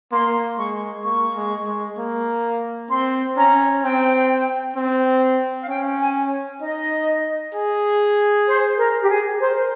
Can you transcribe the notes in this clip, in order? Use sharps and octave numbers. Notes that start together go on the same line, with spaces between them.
A#3 C6
G#3 C#6
A#3 C#6
G#3
G#3
A#3
C4 C6
C#4 A#5
C4 G5
C4
F5
C#4 G5
G#5
D#4 D#5
G#4
C5
A#4
G4
G#4
A#4 C5